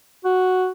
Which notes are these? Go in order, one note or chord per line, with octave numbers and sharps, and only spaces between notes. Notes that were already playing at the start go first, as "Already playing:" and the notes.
F#4